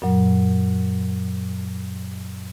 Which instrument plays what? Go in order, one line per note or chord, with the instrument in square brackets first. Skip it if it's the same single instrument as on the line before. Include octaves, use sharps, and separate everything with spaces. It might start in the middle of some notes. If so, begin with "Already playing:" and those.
[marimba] F#2 A#2 F#3